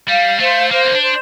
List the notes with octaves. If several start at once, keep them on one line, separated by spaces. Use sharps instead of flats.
G3 F5
A3 C5
A#3 C5
C4
D4
C5